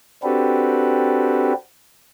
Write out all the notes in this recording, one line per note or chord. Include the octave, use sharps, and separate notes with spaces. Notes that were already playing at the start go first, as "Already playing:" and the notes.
C4 D4 F#4 G4 A4 B4